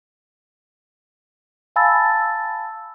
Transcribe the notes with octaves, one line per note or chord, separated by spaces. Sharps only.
F5 G#5 A5 B5 E6 A6